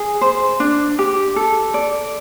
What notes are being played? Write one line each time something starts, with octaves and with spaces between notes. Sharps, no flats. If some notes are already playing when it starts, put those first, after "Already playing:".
Already playing: G#4
C5
D4
G4
A4
D5